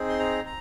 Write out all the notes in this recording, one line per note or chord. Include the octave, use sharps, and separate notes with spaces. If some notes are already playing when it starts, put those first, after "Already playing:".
Already playing: C4 D#4 G#4
C6
A#5
A#5